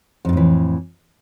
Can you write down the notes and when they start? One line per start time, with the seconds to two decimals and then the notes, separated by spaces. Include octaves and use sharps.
0.25 F2
0.29 C3
0.33 A2
0.37 E3